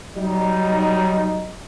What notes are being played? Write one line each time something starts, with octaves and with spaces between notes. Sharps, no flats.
F#3 G3 D#4